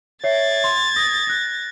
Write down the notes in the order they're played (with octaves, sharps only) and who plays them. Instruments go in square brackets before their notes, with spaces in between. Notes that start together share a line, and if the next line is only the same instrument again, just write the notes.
[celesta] C#5 E5 C7 [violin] G#6 A6
[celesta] C6
D#6 A#6
F#6 A#6